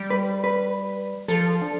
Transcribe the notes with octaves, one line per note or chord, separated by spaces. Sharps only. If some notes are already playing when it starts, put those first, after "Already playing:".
Already playing: G3
B4
B4
F3 A4
D4